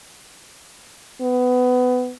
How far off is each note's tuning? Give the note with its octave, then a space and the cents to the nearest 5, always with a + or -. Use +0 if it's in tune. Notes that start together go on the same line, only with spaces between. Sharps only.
B3 +20